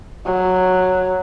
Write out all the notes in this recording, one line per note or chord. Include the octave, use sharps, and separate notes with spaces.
F#3